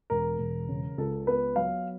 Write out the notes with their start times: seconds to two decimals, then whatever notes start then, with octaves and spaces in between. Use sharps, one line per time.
0.10 E1 A#4
0.39 E1
0.68 C#3
0.98 C#2 A4
1.27 B3 B4
1.56 F#3 F5